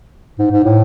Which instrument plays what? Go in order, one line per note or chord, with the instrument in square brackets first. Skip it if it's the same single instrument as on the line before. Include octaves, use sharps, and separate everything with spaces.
[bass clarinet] G#2
G#2
A2